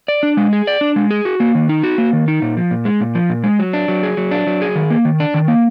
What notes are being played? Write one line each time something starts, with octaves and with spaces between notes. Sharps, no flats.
D5
D4
G#3
G#4
D5
D4
G#3
G#4
F#4
A#3
D#3
D#4
F#4
A#3
D#3
D#4
A#2
F3
A#2
G#3
A#2
F3
A#2
G#3
F#3
D4
F#3
G#4
F#3
D4
F#3
G#4
D#3
A#3
D#3
D4
D#3
A#3